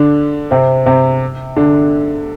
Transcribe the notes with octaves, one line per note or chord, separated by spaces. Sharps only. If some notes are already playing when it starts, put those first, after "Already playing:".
Already playing: D3 D4
C3 C4
C3 C4
D3 D4